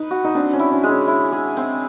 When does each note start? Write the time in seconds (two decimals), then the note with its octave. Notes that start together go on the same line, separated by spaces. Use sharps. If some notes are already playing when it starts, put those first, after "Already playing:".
Already playing: D#4 B4
0.11 F#4
0.25 D#4
0.35 C4 D4
0.53 C#4
0.59 E4
0.72 C#4
0.83 G#3
0.89 C#4
1.08 E4
1.32 G#4
1.57 C4